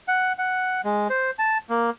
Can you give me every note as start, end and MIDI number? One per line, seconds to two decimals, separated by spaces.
0.08 0.33 78
0.38 0.81 78
0.85 1.08 56
1.10 1.31 72
1.39 1.58 81
1.70 1.90 58